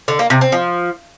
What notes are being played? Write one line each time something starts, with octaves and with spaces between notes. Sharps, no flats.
D3
A#3
C3
C4
F3